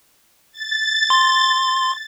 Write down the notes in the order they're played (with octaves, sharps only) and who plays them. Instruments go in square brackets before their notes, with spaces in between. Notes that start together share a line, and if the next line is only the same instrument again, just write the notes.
[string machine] A6
[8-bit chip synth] C6